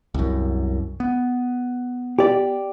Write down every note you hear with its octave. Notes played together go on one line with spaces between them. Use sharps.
C2 F#2
B3
G4 D5